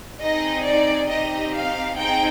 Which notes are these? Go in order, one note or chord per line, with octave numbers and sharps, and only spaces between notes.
C4 D#4 G#4 D#5
D5
C4 D#4 G4 D#5
F5
C4 D#4 G#4 G5